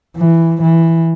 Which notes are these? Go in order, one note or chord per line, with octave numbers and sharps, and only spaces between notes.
E3
E3